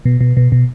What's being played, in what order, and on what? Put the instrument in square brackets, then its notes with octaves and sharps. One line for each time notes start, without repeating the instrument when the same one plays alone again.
[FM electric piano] B2
B2
B2
B2